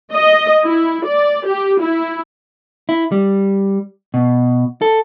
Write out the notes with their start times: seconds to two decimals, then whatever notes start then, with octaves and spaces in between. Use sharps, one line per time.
0.13 D#5
0.64 E4
1.06 D5
1.47 G4
1.81 E4
2.89 E4
3.12 G3
4.14 B2
4.82 A4